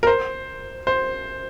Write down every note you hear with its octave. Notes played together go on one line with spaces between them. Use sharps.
A#4
C5
C5